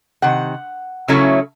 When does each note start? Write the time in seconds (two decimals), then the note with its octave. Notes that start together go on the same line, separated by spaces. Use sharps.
0.22 C3 D#3 F#5
1.08 C#3 F#3 A3 C#4 E4